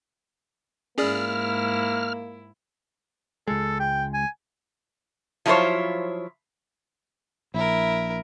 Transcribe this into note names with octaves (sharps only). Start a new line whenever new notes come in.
G#2 A#3 C#4 E4 G#4 D5 F6
C#2 G#3 A4
G5
G#5
F3 F#3 E4 F4 C5 C#5
A#1 E4 A#4